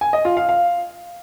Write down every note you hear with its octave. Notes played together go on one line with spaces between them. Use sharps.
G#5
D#5
F4
F5
F5